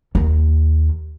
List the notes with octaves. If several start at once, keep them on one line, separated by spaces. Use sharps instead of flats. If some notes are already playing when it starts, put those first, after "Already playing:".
D#2